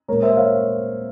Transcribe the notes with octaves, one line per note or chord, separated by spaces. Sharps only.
A#2 G#3 A#4 C#5
C5 E5
C#5 F5